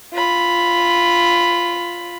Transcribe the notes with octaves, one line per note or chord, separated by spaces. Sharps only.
F4 B5